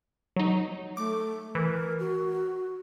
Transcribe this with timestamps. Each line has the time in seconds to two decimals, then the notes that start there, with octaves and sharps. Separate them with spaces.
0.36 F#3 D#4
0.97 A3 D6
1.55 E3 A#4
1.99 F#4